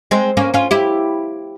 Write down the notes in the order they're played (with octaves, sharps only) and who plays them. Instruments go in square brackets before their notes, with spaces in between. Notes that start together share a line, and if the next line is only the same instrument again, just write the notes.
[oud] G#3 C4
A#3 C#4
C#4 F4
E4 G4